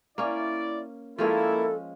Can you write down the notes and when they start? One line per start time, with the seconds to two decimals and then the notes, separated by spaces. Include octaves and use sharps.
0.18 A#3 C#4 E4 D5
1.18 F3 G#3 A#3 C#4 E4 A4